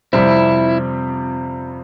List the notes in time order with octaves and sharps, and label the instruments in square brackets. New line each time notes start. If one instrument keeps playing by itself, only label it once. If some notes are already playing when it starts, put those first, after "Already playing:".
[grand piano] F2 C3 G3 C4 [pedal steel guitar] E4